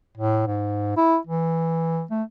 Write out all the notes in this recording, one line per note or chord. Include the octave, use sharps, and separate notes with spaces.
A2
G#2
E4
E3
A3